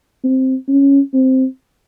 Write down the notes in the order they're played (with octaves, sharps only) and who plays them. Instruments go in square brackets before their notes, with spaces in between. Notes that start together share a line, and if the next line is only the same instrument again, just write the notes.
[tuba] C4
C#4
C4